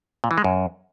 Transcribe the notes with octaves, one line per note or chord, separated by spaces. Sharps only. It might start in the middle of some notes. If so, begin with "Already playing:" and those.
A#2
E3
G#3
F#2